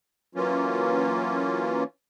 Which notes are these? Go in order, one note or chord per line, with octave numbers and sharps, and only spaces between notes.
E3 F#3 A#3 C#4 F4